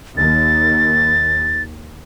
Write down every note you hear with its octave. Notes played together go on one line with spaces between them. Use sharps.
D#2 A6